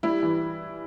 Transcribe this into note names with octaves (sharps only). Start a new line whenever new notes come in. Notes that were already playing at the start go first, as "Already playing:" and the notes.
G3 E4
E3